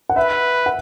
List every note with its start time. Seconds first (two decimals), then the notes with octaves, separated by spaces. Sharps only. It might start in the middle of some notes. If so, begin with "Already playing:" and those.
0.09 F#5
0.16 B4 E5
0.66 F#5